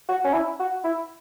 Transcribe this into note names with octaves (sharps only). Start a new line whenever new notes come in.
F#4
C#4
E4
F#4
E4